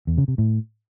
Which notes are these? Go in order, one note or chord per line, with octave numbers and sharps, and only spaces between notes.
E2
C#3
C3
A2